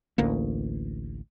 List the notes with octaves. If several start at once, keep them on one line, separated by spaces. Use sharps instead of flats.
A1 D2 A#3